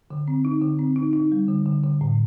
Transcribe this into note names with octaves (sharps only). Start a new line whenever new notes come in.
D3
C4
D#4
D3
C4
D#4
D#4
G3
D3
D3
D3
A2